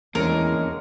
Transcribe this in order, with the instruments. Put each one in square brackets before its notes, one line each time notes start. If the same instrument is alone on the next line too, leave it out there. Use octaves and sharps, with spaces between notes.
[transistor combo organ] E2 [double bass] G#3 [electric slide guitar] A#3 C#4 D4 [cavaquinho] A#4